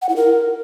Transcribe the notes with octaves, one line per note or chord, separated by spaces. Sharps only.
F#5
E4
A#4